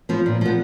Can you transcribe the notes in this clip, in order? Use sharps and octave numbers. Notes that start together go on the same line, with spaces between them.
F3 B3
A#2
F3 B3